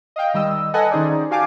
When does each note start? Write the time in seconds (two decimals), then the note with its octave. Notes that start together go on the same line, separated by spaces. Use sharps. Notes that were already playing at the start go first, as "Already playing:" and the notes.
0.16 D#5 F5 G5
0.34 D#3 G3 D#5 E6
0.74 A4 B4 D#5 F#5 G#5 A5
0.91 D#3 C#4 D#4 G#4 C5 D5
1.31 F#4 G4 F5 G#5 A5 D6